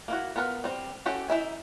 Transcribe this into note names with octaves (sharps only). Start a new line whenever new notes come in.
A#3 E4 F#4
B3 F4 A#4 B4
G3 C4
C#4 F#4 G4 A4
D#4 E4 E5 G#5